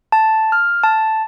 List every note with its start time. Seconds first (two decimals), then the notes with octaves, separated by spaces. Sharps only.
0.12 A5
0.52 F6
0.83 A5